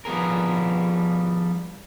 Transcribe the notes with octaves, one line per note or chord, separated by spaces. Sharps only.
F3 G3 B3 G#4 A#4